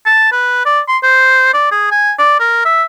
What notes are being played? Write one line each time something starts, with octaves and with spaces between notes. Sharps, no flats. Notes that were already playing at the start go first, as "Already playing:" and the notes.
A5
B4
D5
C6
C5
D5
G#4
G#5
D5
A#4
E5